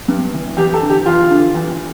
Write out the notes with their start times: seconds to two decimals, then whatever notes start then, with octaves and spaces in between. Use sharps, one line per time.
0.08 G2
0.33 E3
0.57 E2 G4
0.74 A4
0.82 D3
0.90 G4
1.06 E2 F4
1.30 D3
1.54 E2